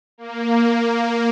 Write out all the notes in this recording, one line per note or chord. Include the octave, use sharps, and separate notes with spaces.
A#3